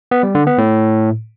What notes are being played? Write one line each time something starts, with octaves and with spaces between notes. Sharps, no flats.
B3
G3
D3
B3
A2